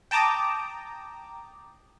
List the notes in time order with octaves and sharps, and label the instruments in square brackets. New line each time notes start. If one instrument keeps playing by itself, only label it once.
[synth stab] G5 A5 A#5 D6 D#6